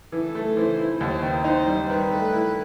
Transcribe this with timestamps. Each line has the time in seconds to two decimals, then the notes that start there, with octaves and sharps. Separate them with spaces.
0.12 E3 A4
0.35 A3
0.57 E3 C5
0.79 E4
1.00 D#2 C5
1.22 D#3
1.44 D#4 C5
1.67 G3
1.89 D#3 B4
2.11 A3
2.32 E4